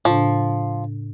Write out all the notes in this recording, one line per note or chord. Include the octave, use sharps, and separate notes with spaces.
A2 C#3 F3 D4